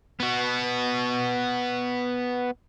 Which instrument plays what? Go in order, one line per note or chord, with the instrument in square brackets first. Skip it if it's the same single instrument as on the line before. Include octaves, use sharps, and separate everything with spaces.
[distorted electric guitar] B3 F#4